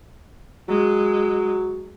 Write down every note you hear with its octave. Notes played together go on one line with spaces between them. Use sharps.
F#3 G#3